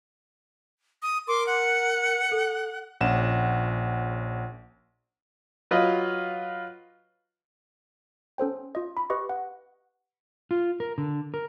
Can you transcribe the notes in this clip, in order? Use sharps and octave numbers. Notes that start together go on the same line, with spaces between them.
D#6
A#4 C6 D6
F#5 C#7
A4
A#1 C#4 F#5 E7
F#3 F4 B4 D#5
C#4 A4 C5 G5
F4 D#5
B5
G4 B4 D#5 C#6
F#5
F4
A#4
D3
A#4